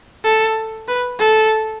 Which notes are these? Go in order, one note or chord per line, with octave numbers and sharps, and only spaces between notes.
A4
B4
A4